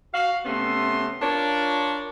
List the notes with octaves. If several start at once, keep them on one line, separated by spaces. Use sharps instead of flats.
F#4 F5
C3 A3 B3 C#4 C6
D4 F4 A#4 C#5 D5